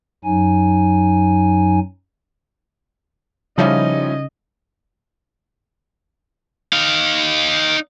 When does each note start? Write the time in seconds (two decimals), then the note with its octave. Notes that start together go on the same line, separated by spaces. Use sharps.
0.24 F#2 F#3 D#4 G#5
3.58 C#3 F3 G3 C#4 D#4 E4 D#5
6.73 D#4 F5